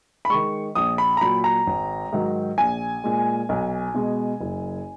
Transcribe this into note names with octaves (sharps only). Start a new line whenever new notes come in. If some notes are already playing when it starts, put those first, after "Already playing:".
B5
D#3 G#3 C#6
A#1 D#6
B5
A#5
A#2 F#3 B5
A#5
G#1
G#2 D#3 F#3
A#1 G#5
A#2 G#3
B1
B2 G#3
F#1